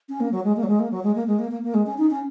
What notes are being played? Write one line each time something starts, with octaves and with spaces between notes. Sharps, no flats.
C#4
A#3
F#3
G#3
A#3
F#3
G#3
A#3
F#3
G#3
A#3
G#3
A#3
A#3
A#3
G#3
C#4
D#4
C#4